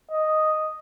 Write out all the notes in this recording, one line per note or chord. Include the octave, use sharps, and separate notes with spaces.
D#5